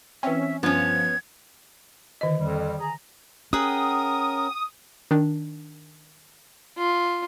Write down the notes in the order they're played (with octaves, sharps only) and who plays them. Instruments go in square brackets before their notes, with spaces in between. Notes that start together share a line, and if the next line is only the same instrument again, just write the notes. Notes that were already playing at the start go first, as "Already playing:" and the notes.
[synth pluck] E3 C4 [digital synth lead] C#4 [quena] E5
[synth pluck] G2 [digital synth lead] F3 [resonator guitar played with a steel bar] B3 C#4 [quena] G#6
[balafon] D3 D#3 D#5
[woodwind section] F2 G3
G#4 A#5
[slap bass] C#4 [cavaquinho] G#4 F#5 G5 [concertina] A#4 [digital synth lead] D#6
[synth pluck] D#3 D4
[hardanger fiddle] F4